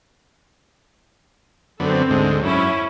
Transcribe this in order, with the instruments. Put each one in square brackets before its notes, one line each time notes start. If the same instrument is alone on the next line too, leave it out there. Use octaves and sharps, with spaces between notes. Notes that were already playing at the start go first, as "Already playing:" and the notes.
[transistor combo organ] F#2 D3 B3 [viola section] C4 A4
[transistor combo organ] D2 G#2
[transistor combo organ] F#2 [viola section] C#4 E4